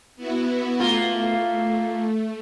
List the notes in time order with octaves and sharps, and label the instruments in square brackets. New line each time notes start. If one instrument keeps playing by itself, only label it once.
[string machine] B3 E4 F#4
[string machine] A3 [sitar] A#3 F4